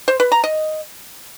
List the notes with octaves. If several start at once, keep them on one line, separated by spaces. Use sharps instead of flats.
C5
B4
A#5
D#5